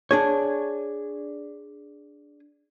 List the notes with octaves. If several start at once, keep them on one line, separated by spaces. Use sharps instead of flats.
D4 G#4 C#5